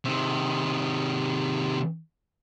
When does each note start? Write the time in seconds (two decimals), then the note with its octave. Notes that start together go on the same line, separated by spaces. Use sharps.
0.05 C3 D#3